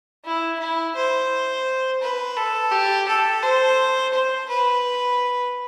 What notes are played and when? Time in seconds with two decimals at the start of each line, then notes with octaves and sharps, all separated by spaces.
0.25 E4
0.60 E4
0.95 C5
2.02 B4
2.37 A4
2.72 G4
3.08 A4
3.43 C5
4.14 C5
4.49 B4